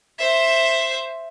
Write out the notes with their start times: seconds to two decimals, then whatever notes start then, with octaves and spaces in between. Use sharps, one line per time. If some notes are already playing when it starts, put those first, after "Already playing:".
0.19 C5 E5